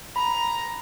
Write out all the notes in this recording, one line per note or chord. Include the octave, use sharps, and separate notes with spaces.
A#5 B5